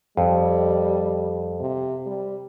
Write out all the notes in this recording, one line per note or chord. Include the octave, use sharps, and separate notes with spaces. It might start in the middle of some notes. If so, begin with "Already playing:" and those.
F2 G3
C3
G3